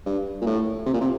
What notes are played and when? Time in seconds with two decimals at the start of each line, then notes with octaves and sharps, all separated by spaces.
0.06 G2
0.41 A#2
0.46 A2
0.86 C3
0.93 A#2
1.01 C3